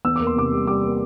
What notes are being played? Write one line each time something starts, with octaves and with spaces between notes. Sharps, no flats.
E2 E6
A#3 D6
C6
C3 D6
G3
G3 D6
A#3